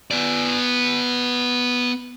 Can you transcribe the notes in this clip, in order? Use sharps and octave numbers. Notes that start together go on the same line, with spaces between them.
B3 D5